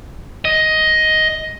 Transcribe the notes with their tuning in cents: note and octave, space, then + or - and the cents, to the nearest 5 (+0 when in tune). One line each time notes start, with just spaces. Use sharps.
D#5 +10